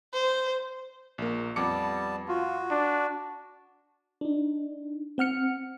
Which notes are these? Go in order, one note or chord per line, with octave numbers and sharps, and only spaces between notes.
C5
A#1 A#3
F2 G3 B3 A5 D6 C#7
F4 F#4
D4
D4 D#4
C4 F#5 F6 C#7